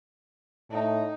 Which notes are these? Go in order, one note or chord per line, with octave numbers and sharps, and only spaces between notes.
A2 D#4